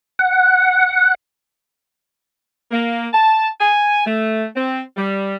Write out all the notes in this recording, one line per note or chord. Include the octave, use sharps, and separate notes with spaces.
F#5
A#3
A5
G#5
A3
C4
G3